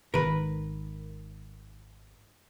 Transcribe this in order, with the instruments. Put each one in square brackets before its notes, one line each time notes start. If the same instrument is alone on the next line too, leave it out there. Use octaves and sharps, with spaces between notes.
[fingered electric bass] G#1 D#3 [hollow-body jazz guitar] A#4 B4